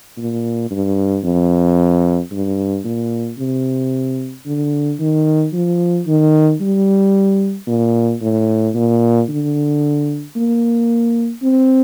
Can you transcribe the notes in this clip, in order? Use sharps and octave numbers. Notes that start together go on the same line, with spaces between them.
A#2
G2
F2
G2
A#2
C3
D3
D#3
F3
D#3
G3
A#2
A2
A#2
D3
A#3
C4